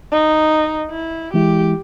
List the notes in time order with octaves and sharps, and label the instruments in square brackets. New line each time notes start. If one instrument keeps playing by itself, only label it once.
[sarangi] D#4
E4
[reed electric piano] E3 G#3 E4 [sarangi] G4